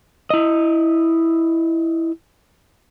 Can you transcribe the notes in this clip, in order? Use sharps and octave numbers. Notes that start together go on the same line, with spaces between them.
E4 D#5